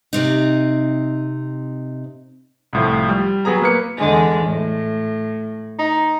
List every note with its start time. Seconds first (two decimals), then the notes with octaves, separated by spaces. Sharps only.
0.13 C3 C4 D#4
2.73 C2 A2 F3
3.09 G3
3.45 F#3 B3 G#4 A#5
3.62 A#3 B4 C#7
3.96 E2 D3 G#3
4.45 A2
5.79 D#4